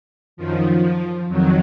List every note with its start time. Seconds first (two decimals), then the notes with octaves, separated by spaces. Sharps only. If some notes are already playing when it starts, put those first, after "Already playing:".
0.37 F#2 D#3 F3
1.29 F2 D#3 F#3